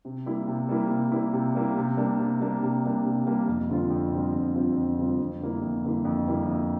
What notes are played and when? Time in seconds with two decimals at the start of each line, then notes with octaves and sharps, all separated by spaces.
0.05 C3
0.26 G3 A#3 E4
0.47 C3
0.69 G3 A#3 E4
0.90 C3
1.12 G3 A#3 E4
1.33 C3
1.55 G3 A#3 E4
1.77 C3
1.97 G3 A#3 D4
2.19 C3
2.40 G3 A#3 D4
2.63 C3
2.83 G3 A#3 D4
3.05 C3
3.27 G3 A#3 D4
3.48 F2
3.69 D3 G3 C4 F4
3.90 F2
4.13 D3 G3 C4 F4
4.34 F2
4.55 D3 G3 C4 F4
4.76 F2
4.98 D3 G3 C4 F4
5.20 F2
5.41 D3 G3 A#3 E4
5.62 F2
5.85 D3 G3 A#3 E4
6.05 F2
6.27 D3 G3 A#3 E4
6.49 F2